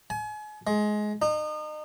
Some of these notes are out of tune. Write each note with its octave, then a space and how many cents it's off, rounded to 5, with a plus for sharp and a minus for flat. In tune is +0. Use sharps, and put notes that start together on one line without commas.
G#5 +35
G#3 +20
D#4 -35